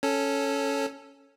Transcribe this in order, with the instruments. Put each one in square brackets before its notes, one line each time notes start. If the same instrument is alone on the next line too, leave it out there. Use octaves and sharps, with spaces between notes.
[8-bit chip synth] C#4 A4